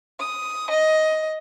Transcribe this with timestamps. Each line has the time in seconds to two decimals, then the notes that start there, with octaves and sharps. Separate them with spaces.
0.19 D#6
0.70 D#5